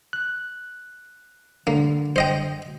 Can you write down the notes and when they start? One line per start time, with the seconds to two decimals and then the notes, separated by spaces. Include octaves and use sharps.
0.13 F#6
1.67 D3 A#3
2.16 C5 D#5 G5